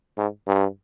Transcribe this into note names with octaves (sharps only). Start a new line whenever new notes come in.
G#2
G2